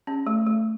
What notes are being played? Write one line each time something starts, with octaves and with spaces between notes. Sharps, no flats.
C#4
A3
A3